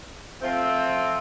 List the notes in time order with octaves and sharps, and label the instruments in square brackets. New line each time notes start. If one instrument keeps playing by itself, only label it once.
[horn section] F3 A3 C4 F4